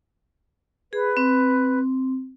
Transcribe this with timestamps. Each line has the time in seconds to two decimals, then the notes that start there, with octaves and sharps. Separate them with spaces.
0.93 G#4 B4
1.17 C4